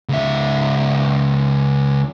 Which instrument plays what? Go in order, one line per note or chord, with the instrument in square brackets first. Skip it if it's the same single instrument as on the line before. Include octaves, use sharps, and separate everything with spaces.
[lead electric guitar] C#2 E5